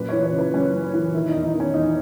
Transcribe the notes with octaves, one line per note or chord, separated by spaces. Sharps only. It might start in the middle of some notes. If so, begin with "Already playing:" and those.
Already playing: F#2 A#2 B4
E3 C#5
C#5
C#3
B4
F#2 C#4
F#2
E3
D#3 E4
D#4
E2
D#4
D#3
C#4
E2 D#4